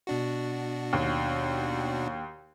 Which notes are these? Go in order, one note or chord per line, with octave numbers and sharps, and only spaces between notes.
B2 D4 F#4
D#2